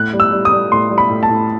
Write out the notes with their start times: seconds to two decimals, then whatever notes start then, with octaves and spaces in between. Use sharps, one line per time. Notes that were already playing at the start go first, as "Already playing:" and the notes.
Already playing: A2 F#6
0.13 G3
0.20 E6
0.32 G3
0.45 D#6
0.52 G3
0.72 A2 C6
0.90 G3
0.98 B5
1.09 A2
1.23 A5
1.29 A2